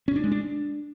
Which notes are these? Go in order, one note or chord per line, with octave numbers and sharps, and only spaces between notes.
C#4
D4
G#3
D4